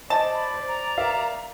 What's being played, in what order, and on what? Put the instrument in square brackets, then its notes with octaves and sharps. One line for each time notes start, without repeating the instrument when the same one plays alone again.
[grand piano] C5 D#5 [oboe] D5 [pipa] A5
[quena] B5
[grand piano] C5
[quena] A#5
[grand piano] A#4 E5 F5